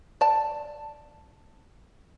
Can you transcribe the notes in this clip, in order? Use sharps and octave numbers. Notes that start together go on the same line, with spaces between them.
D5 A5